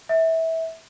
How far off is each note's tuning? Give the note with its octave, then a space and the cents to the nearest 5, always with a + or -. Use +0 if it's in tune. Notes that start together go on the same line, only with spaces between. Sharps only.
E5 -20